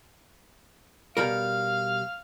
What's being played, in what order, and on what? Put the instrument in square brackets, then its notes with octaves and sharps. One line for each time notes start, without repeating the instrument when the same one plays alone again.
[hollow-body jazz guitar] B2 G3 A#4 [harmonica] F5